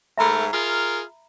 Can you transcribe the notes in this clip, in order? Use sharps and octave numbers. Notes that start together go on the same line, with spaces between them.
G#2 A3 A#4 E5 A#5 B5
F4 G#4 A#4